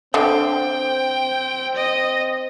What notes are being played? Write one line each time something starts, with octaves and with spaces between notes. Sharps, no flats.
D3 C4 G5
D#5